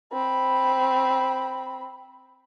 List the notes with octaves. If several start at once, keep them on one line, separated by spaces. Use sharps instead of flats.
C4 B5